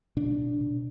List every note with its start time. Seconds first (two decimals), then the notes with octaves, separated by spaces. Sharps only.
0.17 B2 D4
0.39 B2
0.60 B2